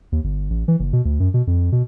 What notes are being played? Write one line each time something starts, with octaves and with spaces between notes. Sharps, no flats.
D#2
G1
A1
E3
F#1
B2
D2
F#2
B2
F2
B2